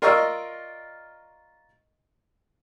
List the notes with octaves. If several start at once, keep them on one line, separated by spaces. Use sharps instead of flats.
F4 A#4 D5 D#5 C#6 E6